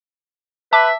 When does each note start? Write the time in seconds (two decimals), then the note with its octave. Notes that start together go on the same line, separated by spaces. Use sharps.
0.73 B4 E5 A5 D6